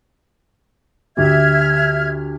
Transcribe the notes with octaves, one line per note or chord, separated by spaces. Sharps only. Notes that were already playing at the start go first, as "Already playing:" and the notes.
D2 G4 E5 F6 G#6